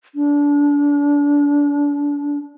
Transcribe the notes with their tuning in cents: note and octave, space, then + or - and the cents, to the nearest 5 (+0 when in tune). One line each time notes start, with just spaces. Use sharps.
D4 -30